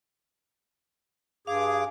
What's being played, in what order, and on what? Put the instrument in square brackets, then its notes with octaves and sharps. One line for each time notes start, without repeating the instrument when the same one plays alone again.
[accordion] G2 G#4 D6 [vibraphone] F5